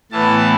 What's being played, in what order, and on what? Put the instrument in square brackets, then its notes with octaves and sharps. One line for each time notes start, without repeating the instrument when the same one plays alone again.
[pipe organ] A2 E3 B3 A5